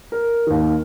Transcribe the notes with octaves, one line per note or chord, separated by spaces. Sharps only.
A#4
D#2 D#3